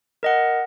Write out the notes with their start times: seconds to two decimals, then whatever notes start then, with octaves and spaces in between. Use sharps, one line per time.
0.23 A#4 D#5 F#5